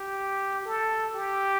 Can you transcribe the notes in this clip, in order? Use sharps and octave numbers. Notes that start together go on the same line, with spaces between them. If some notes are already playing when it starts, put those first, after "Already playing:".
Already playing: G4
A4
G4